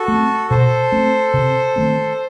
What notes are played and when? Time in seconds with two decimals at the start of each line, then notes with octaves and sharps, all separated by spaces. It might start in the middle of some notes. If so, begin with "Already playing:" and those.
Already playing: F#4 A4
0.08 A3 C4
0.50 B2 A4 C5
0.92 A3 C4
1.34 C3
1.76 D#3 A3 C4